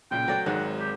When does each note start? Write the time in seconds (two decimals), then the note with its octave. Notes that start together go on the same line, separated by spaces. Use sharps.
0.11 B1 A#2 C#3 G5
0.28 F#3 A3 C4 F#4 D5 F#5
0.46 G#1 G#2 D#3 F#3 F#5
0.79 G4